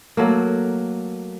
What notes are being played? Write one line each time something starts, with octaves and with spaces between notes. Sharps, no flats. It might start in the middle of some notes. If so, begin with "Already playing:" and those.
F#3 A3 A#3